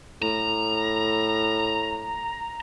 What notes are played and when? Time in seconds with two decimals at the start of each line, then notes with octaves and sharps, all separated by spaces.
0.22 A2 A#5